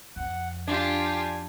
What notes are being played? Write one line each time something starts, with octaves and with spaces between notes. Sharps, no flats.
F2 F#5
D4 F4 G4 G#5